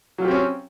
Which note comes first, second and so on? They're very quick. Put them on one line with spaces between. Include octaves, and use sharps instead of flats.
F#3 F4 G4 C4 C#4